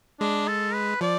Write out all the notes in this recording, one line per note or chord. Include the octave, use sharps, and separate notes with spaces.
G#3 D4
A4
B4
F3 D5